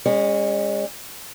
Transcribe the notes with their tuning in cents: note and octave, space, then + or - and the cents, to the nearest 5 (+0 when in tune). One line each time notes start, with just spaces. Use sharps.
G#3 -35 C#4 +0